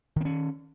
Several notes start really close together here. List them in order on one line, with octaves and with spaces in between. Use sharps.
D#3 C4 C#4